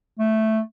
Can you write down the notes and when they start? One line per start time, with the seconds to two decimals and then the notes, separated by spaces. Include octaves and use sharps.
0.19 A3